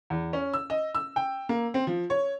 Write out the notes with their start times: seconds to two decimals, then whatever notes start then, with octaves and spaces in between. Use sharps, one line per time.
0.10 E2
0.33 C#4
0.54 E6
0.70 D#5
0.95 E6
1.16 G5
1.49 A#3
1.74 C4
1.87 F3
2.10 C#5